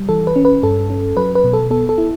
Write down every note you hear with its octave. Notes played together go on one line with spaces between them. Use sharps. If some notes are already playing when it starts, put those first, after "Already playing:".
Already playing: G3
E3 A4
B4
C#4
B4
G2 A4
C#4
F#3 B4
B4
B2
A4
B3 A4
A4
E4